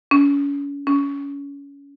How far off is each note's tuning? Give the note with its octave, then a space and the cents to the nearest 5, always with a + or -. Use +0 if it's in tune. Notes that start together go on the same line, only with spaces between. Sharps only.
C#4 +35
C#4 +25